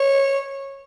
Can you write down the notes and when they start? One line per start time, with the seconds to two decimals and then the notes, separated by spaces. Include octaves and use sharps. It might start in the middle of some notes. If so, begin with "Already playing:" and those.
Already playing: C#5